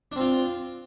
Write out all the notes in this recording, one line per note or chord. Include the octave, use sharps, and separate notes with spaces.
C4 D4 F4